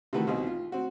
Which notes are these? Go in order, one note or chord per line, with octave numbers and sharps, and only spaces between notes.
C3 D#3 E3 A3 F#4 B4
C2 B2 C4 D#4
F4
C4 F#4